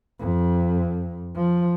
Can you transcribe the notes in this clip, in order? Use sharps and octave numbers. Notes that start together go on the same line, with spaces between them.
F2
F3